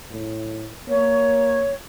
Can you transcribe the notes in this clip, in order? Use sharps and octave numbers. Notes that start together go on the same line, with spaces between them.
A2
A#3 C#5